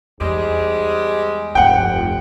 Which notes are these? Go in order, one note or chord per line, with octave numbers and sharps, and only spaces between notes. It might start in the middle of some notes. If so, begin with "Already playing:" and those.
E2 G#2 G3 G#3
F1 D2 G2 F#5 G5